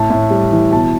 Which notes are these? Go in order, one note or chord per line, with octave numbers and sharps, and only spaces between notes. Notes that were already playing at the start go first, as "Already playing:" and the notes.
Already playing: A2 A5
A2
G3
E3
B2 A5